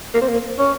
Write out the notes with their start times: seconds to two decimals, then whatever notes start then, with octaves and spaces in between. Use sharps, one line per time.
0.14 A#3
0.21 C4
0.29 A#3
0.58 C#4